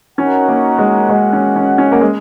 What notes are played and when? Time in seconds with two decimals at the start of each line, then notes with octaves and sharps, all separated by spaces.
0.18 C#4 D#4 F#4 A#4 C#5 F#5
0.48 A#3
0.79 G#3
1.09 G#3 F#4 D#5 F#5
1.33 C#4
1.56 C#4
1.78 C#4
1.92 A#3
2.01 G#3